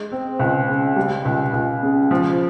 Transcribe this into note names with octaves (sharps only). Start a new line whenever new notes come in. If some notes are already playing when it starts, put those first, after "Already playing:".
Already playing: G#3
C4
C#2
C#3
G3
C#2
C#2
C#3
F3